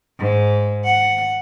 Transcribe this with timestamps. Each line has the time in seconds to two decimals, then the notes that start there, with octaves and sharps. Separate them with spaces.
0.19 G#2
0.85 F#5